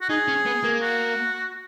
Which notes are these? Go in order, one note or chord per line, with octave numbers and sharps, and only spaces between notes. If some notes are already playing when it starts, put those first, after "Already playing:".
F#4
D#4 G#4
C#4
B3
A#3
F#4